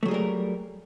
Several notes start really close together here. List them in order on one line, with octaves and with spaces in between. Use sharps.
A3 F#3 G#4 G3 A#4